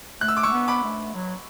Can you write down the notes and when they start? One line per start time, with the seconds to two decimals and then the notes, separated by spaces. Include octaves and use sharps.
0.21 A3 F#6
0.28 E6
0.37 D6
0.43 A3 C#6 E6
0.52 B3
0.68 B5 D6
0.84 A3
1.15 F#3